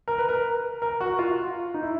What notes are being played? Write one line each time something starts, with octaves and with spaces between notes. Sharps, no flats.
A#4
B4
A#4
A#4
F#4
F4
D#4
E4